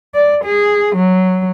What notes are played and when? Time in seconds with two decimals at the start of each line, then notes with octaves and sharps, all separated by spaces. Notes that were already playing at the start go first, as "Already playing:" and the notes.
0.14 D5
0.45 G#4
0.96 F#3